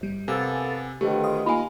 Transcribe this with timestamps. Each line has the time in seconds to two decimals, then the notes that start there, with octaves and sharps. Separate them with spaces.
0.01 G1 G3
0.28 C3 A#3 B3 A4 G#5 E6
1.01 F2 B2 D3 D#3 A3 G4
1.24 F5 C6 D#6
1.46 A#3 D#4 F4 D#5 F5 G#5 B5